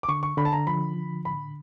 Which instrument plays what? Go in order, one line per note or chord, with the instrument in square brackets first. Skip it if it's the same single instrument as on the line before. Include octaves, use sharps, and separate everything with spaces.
[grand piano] D6
[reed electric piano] D3 [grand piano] C#6
[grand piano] C#6
[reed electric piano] D3 [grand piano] B5
[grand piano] A5
A#5
[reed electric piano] F3 [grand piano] B5
[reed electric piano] D3
[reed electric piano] A2 [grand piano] B5